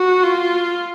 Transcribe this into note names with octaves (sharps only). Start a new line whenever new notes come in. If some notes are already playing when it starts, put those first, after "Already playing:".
Already playing: F#4
F4